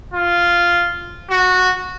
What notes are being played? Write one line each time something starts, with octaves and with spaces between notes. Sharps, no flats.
F4
F#4